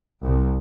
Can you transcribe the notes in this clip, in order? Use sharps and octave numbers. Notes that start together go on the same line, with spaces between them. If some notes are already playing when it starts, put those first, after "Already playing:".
C2